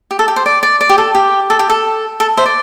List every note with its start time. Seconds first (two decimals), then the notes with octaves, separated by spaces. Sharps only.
0.11 G4
0.19 A4
0.28 G4
0.36 C5
0.46 D5
0.63 D5
0.81 D5
0.89 G4
0.98 A4
1.15 G4
1.50 A4
1.59 G4
1.70 A4
2.20 A4
2.37 C5 E5
2.46 D5